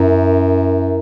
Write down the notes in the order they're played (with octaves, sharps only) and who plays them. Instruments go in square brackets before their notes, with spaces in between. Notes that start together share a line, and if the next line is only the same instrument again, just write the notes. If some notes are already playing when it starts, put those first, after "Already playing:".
Already playing: [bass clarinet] F#2 [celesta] E4 A#4 E5 A#5